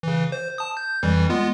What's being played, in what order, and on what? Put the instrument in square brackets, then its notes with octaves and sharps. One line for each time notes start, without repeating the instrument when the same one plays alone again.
[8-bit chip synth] C#3 E3
C5
A5 D#6
G6
F2 E3 G3
G#3 B3 F4